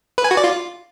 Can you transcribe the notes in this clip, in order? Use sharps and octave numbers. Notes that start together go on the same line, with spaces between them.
B4
G#5
F#4
D5
F4